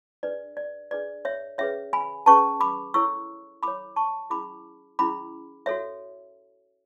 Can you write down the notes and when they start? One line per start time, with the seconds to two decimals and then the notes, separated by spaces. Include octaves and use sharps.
0.23 D4 G#4 B4 D5
0.57 D5
0.91 D4 G#4 B4 D5
1.25 C#5 E5
1.58 C#4 G#4 B4 C#5 E5
1.93 G#5 B5
2.26 C#4 G#4 B4 A5 C#6
2.60 B5 D6
2.94 E4 A4 C#5 C#6 E6
3.63 E4 A4 C#5 B5 D6
3.96 A5 C#6
4.30 C#4 E4 G#4 B5 D6
4.99 C#4 E4 G#4 B5 D6
5.66 F#4 A4 C#5 E5